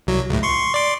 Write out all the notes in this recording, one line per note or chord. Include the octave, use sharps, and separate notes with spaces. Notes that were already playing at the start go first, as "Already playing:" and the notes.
C2 F#3
C#2 A2
C6 C#6
D5 C6 D6